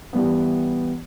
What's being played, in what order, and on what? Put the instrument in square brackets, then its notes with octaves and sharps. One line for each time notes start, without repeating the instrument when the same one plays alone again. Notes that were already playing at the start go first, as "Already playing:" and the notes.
[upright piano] E3 G3 B3